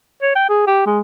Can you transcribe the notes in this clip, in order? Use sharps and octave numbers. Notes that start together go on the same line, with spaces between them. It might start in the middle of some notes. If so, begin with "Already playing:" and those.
C#5
G5
G#4
G4
G#3